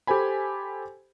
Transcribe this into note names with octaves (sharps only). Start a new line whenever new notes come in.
G4 A4 C5 G#5 B5